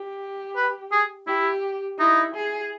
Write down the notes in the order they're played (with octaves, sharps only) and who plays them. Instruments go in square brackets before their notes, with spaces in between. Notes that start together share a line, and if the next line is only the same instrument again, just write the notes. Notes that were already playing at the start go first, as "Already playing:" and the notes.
Already playing: [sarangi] G4
[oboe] B4
G#4
[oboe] E4 [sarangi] G4
[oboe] D#4 [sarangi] E4
[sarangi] G#4